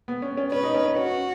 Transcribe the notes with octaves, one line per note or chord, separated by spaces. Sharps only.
B3
C#4
C#4
C#4 B4
D#4
C#4
C#4
C#4 F#4